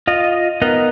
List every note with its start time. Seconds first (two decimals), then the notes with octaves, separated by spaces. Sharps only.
0.07 F4 D#5
0.62 B3 D#4 A#4 D#5 F#6